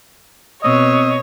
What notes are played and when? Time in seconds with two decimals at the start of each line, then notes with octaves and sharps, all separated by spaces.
0.63 B2 C4 C#5 D#5 E6